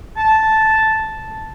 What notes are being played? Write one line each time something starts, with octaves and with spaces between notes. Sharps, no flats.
A5